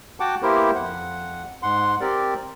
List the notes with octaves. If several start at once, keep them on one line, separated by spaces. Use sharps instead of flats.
F#4 F#5 G5 A5 D6
A#3 B3 E4 G4 A#4 C5
F2 F#5
G#2 F#5 C6
C4 G4 A#4 D5